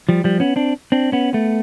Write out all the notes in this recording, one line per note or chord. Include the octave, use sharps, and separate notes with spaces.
F3 G3
F3 G3
B3 C#4
C4 D4
C4 D4
B3 C#4
A3 B3